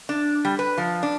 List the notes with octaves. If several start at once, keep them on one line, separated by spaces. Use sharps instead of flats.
D4
G3
B4
F3
D4